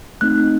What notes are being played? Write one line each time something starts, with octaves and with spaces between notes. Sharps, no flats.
A3 C4 D#4 F#6